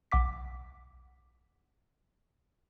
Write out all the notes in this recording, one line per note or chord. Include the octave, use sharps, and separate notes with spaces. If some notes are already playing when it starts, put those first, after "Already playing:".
B1 F#5 D6 B6